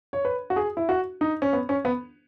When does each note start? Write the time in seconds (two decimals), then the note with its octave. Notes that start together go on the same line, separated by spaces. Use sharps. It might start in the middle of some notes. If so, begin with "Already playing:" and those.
0.13 C#5
0.25 B4
0.50 F#4
0.56 G#4
0.77 E4
0.89 F#4
1.21 D#4
1.42 C#4
1.53 B3
1.69 C#4
1.85 B3